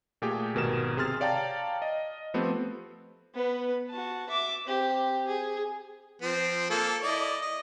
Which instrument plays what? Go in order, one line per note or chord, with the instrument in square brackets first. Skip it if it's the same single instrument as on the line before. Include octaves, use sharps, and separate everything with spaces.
[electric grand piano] A#2 A3 G4 G#4 G5
G#1 B2 A#4 E7
C3 G#4 C6 F6 A6
C#5 D5 F5 G5 A5 A#5
D#5
F3 A3 B3 C4 G4
[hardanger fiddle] B3 B4
F#4 A5
E5 D6
C4 G4
G#4
[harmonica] F3 C4
A#3 A4
E4 D5 D#5
D#5